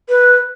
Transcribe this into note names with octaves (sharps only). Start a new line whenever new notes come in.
B4